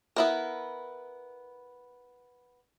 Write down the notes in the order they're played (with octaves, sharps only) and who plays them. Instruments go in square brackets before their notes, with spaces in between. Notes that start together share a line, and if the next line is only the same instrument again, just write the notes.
[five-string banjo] B3 E4 A#4